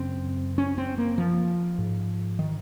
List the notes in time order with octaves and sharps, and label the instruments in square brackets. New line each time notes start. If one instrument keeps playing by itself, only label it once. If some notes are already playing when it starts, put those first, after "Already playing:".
Already playing: [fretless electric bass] F#2 C#3 C4
C#4
C4
A#3
F3
G#2
D#3